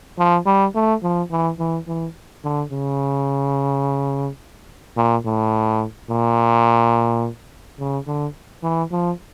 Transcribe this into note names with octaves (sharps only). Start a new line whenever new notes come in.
F3
G3
A3
F3
E3
E3
E3
D3
C#3
A#2
A2
A#2
C#3
D3
E3
F3